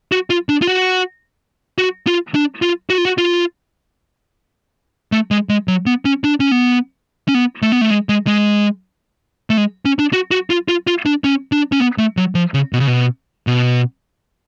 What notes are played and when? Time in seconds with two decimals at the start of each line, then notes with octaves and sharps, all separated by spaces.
0.12 F#4
0.30 F4
0.49 D4
0.62 F4
0.67 F#4
1.78 F#4
2.07 F4
2.35 D4
2.62 F4
2.90 F#4
2.98 F4
3.05 F#4
3.18 F4
5.12 A3
5.31 G#3
5.49 G#3
5.68 F#3
5.86 B3
6.05 C#4
6.24 D4
6.40 C#4
6.51 B3
7.28 C#4
7.34 B3
7.62 A3
7.72 B3
7.81 A3
7.90 G#3
8.09 G#3
8.27 G#3
9.50 A3
9.57 G#3
9.85 C#4
9.99 D4
10.13 F#4
10.31 F#4
10.50 F4
10.68 F4
10.87 F4
11.06 D4
11.24 C#4
11.52 D4
11.72 C#4
11.80 B3
11.98 A3
12.17 F#3
12.35 F3
12.54 C#3
12.73 B2
12.80 C#3
12.87 B2
13.47 B2